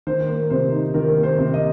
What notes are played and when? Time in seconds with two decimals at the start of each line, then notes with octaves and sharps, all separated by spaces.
0.07 D#3 C5
0.28 A#3
0.50 C3 C5
0.72 D#4
0.94 D#3 A#4
1.16 A#3
1.23 C5
1.38 C3
1.54 D#5